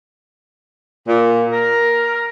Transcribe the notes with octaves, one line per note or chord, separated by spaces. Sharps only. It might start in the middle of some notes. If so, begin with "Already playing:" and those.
A#2
A#4